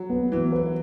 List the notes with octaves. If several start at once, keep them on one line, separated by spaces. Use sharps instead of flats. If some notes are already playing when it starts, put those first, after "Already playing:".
Already playing: F#3
B3
E3 B3
B4